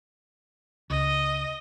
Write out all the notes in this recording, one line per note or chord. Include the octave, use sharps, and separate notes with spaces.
C#2 D#5